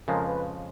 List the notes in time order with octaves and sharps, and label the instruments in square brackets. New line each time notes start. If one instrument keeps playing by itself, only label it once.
[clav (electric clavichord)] F2 C#3 F3 G#3 [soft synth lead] A#4
[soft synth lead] B4